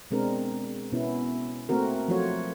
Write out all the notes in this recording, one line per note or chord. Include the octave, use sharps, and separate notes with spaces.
B2 G#3 C4 D4 A#4
B2 B3 C#4 E4
A3 A#3 C4 F#4 A#4
F3 F#3 A3 F4 F#4 C#5